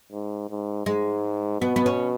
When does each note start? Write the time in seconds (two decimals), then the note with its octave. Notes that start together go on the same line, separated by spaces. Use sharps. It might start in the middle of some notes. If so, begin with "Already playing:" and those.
0.12 G#2
0.50 G#2
0.86 G#2 G#3
1.61 B2 B3
1.76 B3
1.86 C#4